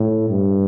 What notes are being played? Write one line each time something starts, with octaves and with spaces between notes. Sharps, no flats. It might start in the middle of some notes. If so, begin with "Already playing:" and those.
Already playing: A2
G2